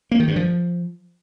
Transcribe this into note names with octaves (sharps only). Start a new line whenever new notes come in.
A#3
D#3
G2
F3